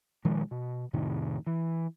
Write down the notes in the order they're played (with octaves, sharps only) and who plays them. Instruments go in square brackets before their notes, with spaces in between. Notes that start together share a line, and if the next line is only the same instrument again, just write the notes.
[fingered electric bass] A#2 D#3 F3 G#3
B2
F2 A2 C3 D#3
E3